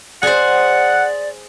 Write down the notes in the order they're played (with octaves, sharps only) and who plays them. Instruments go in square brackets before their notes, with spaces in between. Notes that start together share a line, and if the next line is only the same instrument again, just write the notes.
[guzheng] G#4 C5 [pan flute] D5 [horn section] F#5